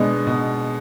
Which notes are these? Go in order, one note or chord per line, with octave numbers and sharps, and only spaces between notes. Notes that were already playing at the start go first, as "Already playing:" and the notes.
Already playing: B2 G#3 B3 D4
B2